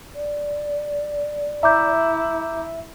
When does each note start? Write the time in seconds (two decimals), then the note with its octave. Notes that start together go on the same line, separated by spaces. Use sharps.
0.15 D5
1.63 E4 E5 A#5 D6 G6